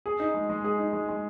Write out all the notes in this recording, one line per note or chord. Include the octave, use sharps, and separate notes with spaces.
G#4
D#4
G#3
G#3
G#4
D#4
G#3
G#3